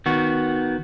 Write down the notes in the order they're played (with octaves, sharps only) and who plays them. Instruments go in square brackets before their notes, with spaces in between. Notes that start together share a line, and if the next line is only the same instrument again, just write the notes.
[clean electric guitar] D#3 B3 F#4